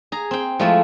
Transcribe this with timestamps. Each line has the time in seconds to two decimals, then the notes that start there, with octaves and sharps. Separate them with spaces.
0.12 G#4 A#5
0.31 C4 G5
0.59 F3 G#3 A3 E4 F4